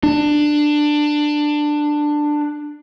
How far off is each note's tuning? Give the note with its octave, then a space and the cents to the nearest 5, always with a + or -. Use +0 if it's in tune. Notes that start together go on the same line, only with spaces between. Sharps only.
D4 +15